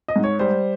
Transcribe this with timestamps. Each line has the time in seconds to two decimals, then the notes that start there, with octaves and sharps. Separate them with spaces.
0.08 D#5
0.16 G#2
0.24 C#5
0.39 G3 C5